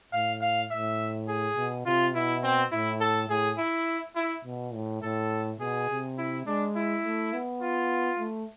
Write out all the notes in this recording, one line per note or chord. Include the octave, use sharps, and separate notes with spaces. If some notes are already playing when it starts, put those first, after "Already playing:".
A2 F5
F5
A2 E5
G#4
B2
C3 F4
B2 E4
C4
A2 E4
A4
A2 G#4
E4
E4
B2
A2
A2 A4
B2 G#4
C3
E4
G#3 D4
E4
A3
B3
F4
A3